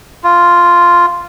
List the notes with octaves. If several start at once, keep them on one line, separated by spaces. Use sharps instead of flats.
F4